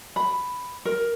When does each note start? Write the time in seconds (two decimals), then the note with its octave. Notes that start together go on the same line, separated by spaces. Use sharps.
0.16 B5
0.85 A#4